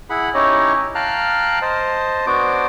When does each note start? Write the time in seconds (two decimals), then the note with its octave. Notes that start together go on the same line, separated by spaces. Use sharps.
0.10 E4 G#4 F#5 B5
0.34 C#4 D#4 E4 G4 C#5 D#5
0.95 F5 G5 A5 A#5 F6 F#6
1.62 C5 D#5 A5
2.27 B3 D4 F#4 C5 D6